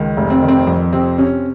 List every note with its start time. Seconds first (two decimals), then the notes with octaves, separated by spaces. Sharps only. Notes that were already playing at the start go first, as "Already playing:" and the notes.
Already playing: C#2 D#3
0.17 F1
0.30 C4
0.42 D#3
0.48 C4
0.67 F2
0.93 C3 C4
1.18 C3 C#4